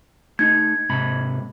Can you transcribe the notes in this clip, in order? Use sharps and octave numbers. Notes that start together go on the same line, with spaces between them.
A3 D#4 G#6
G#2 C3 B5